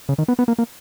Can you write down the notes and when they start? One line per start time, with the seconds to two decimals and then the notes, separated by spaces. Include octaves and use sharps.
0.09 C#3
0.18 D#3
0.28 B3
0.39 B3
0.48 A#3
0.59 A#3